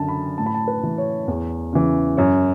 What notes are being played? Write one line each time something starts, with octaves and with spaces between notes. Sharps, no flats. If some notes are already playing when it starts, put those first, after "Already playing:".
Already playing: F#2 D3 A5
B5
A2 A5
B5
A5
B4
E3
C#5
E2
C#3 E3
F#2 C#5